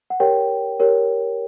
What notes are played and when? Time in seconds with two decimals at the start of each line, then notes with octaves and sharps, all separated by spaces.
0.10 F#5
0.20 G4 A#4 C#5 G5
0.80 G4 A#4 C#5